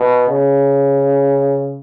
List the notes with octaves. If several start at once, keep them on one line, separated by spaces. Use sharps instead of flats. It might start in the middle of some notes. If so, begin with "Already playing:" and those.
Already playing: B2
C#3